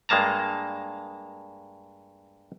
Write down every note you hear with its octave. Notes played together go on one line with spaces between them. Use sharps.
G2 G#3 A#3 A5 A#5